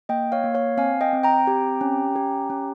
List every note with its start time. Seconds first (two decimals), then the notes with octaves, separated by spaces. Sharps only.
0.09 A#3 D#5 G5
0.32 C#5 F5
0.44 A#3
0.54 C#5 F5
0.77 C4 F5 G#5
1.01 D#5 G5
1.13 C4
1.23 G5 A#5
1.47 G4
1.81 C#4
2.16 G4
2.50 C#4